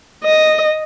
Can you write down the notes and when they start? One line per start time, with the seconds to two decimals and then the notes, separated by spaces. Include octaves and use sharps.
0.24 D#5